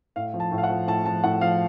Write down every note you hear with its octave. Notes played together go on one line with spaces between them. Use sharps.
A2 F5
F3
A5
A2
F5
F#5
F3
A2 A5
F3 A5
A2 F#5
F3 F5